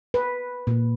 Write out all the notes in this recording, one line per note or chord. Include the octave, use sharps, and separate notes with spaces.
B4
A#2